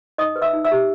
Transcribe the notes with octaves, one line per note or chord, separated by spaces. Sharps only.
D#4 D#5 D#6
B4
E5 E6
D#4
E5 E6
G4